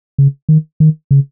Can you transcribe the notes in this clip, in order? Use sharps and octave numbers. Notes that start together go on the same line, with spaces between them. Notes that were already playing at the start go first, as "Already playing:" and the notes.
C#3
D#3
D#3
C#3